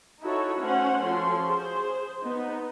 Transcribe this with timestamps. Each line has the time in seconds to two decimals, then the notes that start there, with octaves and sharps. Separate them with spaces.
0.21 D#4 E4 F#4 A4 C#5
0.60 A3 C#4 C5 F#5
1.02 F3 C#4 F#4 A4 C6
1.44 G#4 C5
2.23 B3 D#4